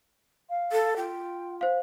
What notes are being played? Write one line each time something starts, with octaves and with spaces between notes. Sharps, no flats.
F5
A4
F4 G5
C5 F5